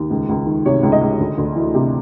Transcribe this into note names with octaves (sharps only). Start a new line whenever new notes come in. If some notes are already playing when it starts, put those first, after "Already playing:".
Already playing: D#2
C#2
C#2
D#3
C3 C#5
C#2
D#5
C#2
D2
D2
E3
C3